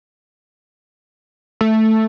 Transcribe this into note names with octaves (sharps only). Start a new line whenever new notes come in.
A3